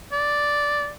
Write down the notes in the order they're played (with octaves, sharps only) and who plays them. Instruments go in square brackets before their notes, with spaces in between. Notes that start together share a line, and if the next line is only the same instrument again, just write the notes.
[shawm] D5